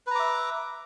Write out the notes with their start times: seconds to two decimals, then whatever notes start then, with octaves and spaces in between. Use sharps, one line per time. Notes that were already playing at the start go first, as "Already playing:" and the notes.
0.07 B4
0.11 A#5
0.15 D6
0.19 E5